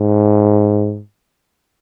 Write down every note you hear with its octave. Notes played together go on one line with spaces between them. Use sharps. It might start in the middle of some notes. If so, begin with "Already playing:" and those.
Already playing: G#2